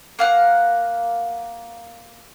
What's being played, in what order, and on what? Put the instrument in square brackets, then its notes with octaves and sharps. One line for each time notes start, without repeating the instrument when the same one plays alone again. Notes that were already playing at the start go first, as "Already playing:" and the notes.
[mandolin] A#3 F5 F#5